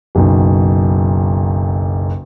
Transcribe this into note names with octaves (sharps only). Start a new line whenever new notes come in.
F#1 B1